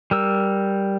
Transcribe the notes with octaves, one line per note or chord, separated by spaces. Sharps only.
G3 A#4 E6